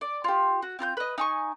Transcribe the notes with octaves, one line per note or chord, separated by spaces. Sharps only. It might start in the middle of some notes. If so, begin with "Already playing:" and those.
D5
F4 G4
F#4
C4 F4 A#5 G6
B4 D#5
D#4 G#5 C#6